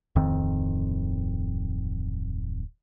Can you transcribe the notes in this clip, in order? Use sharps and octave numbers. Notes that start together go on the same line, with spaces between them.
D1 F2 D#3 C4